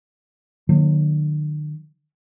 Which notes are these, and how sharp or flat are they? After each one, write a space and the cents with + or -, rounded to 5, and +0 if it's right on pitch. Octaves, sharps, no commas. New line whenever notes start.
D3 +45 F#3 -35 A#3 -5